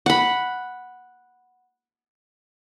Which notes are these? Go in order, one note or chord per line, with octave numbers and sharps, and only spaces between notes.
F#5 B5